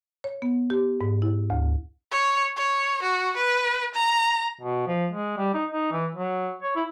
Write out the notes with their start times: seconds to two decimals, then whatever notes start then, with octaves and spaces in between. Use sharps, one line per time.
0.24 C#5
0.42 B3
0.70 G4
1.01 G#2
1.22 E4
1.50 D2
2.12 C#5
2.56 C#5
3.02 F#4
3.37 B4
3.94 A#5
4.61 B2
4.87 F3
5.11 G#3
5.38 G3
5.54 D#4
5.71 D#4
5.92 E3
6.15 F#3
6.63 C#5
6.76 E4